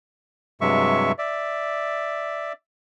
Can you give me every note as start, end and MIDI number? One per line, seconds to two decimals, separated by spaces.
0.61 1.12 43
0.61 1.12 48
0.61 1.12 54
0.61 1.12 56
0.61 1.12 76
0.61 1.12 85
1.18 2.53 74
1.18 2.53 76